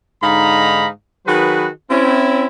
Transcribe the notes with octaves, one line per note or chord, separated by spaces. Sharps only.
G#2 D3 D#4 F5 A#5 B5
D#3 F#3 F#4 G#4 B4
C4 C#4 E4